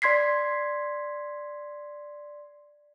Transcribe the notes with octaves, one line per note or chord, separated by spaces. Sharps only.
D5 C6 G#6 B6 C7